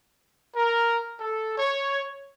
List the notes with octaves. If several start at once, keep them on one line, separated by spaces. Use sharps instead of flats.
A#4
A4
C#5